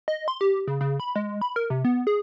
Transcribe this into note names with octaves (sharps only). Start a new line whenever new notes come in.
D#5
C6
G4
C#3
C#3
B5
G#3
B5
A#4
C3
B3
G#4